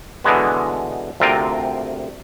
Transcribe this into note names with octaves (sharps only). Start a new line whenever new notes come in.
B2 D3 E3 G#3 B3
D2 C3 C4 F4 A#4 G5